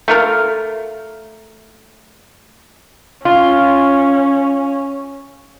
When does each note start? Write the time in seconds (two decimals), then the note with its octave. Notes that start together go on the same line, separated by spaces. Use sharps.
0.08 A3 F4 A#4
3.25 C#4 F4